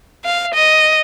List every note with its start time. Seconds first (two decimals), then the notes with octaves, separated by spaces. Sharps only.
0.25 F5
0.54 D#5